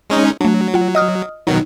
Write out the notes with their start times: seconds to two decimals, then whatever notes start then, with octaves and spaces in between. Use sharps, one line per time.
0.10 G#3 C#4 D#4
0.41 F#3 A3 D4
0.74 F4 F#5
0.95 D#5 D#6 F6
1.47 B2 D#3 F#3 D#4